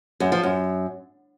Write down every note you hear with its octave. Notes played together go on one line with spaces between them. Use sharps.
F#2
F3
F#2